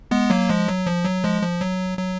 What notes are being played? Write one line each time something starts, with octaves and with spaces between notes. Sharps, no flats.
G#3 B3
F#3 A#3
F3 G#3
F#3
F3
F#3
F3 G#3
F3
F#3
F#3